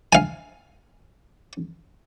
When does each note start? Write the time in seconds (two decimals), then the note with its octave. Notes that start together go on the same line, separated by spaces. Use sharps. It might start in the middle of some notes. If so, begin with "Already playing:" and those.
0.13 F5 G#5